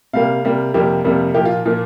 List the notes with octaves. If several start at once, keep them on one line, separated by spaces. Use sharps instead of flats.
C3 G3 A#3 F5
C3 G3 A#3
F2 C3 G3 A#3 G4
F2 C3 G3 A#3
A#2 F3 A#3 G4
F4
A#2 F3 A#3 F4